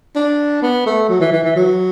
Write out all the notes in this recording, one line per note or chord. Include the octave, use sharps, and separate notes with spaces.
D4
B3
A3
F#3
E3
E3
E3
F#3